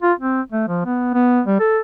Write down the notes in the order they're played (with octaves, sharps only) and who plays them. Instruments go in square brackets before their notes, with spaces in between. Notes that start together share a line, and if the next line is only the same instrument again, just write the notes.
[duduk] F4
C4
A3
F3
B3
B3
G3
A4